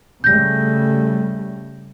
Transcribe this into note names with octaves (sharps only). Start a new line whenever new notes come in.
C#3 G3 A3 G6 A#6